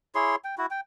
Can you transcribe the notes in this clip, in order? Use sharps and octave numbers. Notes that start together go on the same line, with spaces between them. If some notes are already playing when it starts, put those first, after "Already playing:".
E4 G#4 C#5 C6
G5
E4 F#4
G5